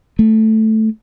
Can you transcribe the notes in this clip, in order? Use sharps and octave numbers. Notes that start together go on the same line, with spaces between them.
A3